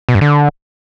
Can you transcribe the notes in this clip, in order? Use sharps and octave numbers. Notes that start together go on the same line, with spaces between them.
B2
G2
D3